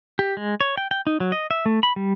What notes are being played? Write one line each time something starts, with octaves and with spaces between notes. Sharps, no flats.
G4
G#3
C#5
G5
G5
D#4
F#3
D#5
E5
A3
B5
G3